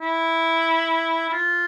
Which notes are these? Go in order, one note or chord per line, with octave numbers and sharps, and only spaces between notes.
E4
E4
F4